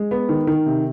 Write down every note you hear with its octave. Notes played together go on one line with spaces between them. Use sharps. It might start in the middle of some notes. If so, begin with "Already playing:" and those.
Already playing: G#3
B3
D#3
D#3
C3